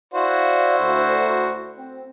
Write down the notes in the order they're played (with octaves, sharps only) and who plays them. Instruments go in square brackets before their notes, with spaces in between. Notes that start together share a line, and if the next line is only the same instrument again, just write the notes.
[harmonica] E4 F#4 C5 [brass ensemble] D5 F5
[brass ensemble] D2
C4